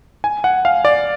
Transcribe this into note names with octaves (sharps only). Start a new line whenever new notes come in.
G#5
F#5
F5
D5